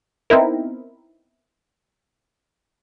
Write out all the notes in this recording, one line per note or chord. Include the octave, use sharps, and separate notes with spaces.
B3 C4 D#4 E4 A#4